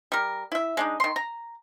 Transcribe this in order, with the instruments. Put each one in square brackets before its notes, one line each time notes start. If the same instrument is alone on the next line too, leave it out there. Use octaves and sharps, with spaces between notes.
[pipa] G3 A#4
E4 E5
G#3 D4 D#4
D#3 C6
A#5